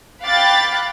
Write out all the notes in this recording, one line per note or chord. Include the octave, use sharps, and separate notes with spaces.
F5 G5 B5 D6 F#6 A6